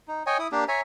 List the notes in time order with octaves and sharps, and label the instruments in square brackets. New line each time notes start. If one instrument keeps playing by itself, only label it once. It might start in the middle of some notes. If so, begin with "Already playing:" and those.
[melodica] D#4
C#5 D#5 G5 G#5
E4 D#6
A#3 D4 G4
C#5 E5 G#5 A#5